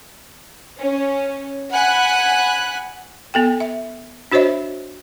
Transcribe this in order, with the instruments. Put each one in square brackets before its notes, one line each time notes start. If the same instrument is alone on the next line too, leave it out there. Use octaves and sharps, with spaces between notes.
[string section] C#4
F#5 G#5 B5 F#6
[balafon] B3 A4 G5
E5
D4 F#4 C5 C#5 D#5 E5